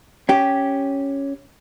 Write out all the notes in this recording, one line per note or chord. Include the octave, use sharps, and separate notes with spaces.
C#4 G4